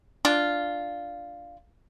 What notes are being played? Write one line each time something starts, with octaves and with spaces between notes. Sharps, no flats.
D4 F4